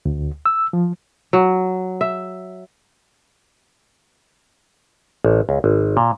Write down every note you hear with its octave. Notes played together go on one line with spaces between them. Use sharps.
D2
E6
F3
F#3
E5
A1
C#2
G#1
A#2